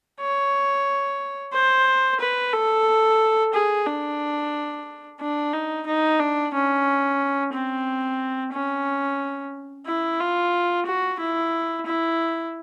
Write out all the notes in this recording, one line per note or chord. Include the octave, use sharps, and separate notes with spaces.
C#5
C5
B4
A4
G#4
D4
D4
D#4
D#4
D4
C#4
C4
C#4
E4
F4
F#4
E4
E4